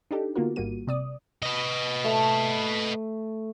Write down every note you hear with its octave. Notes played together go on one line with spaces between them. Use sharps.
D4 D#4 G4 A4
D3 A#3 B3 F4 F#4 A#4
G#1 G3 A#3 F#4 D#7
C3 D5 D#6
B4 D#5
A3